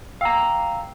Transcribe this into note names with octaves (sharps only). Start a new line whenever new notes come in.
F5 G5 A#5 E6